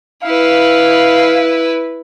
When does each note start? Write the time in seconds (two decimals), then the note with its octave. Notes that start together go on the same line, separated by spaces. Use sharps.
0.23 E4 B4 F5